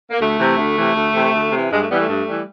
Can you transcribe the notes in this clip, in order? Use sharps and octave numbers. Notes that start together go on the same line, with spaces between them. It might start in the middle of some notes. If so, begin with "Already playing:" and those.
A#3
D2 A3
C3 E3
D2
C3 E3
D2
C3 E3
D2
C3 E3
G2 G#3
A3
E3 G3 B3
A3
G2
E3 G3